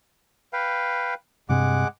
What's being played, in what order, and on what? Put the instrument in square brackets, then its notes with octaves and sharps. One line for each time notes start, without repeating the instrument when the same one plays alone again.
[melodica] B4 F5 G5
[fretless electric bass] G2 C3 C4 [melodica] G#3 F#5 D6